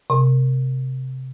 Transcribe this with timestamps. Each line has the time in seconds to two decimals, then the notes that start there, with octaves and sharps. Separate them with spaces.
0.10 C3